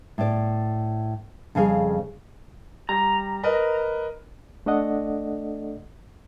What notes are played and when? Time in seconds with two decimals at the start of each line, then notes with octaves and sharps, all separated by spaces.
0.18 A2 D5
1.55 F2 C#3 G3 G#4 F5
2.89 G3 A#5
3.43 A#4 B4 D#5
4.66 A3 D4 A4 D5 D#5 F#5